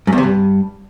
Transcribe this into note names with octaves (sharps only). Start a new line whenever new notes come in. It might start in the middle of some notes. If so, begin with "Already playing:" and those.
F#2
E2
C3
G2